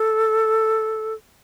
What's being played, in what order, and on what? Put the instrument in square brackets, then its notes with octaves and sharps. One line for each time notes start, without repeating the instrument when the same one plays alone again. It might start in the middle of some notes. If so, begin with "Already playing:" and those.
Already playing: [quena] A4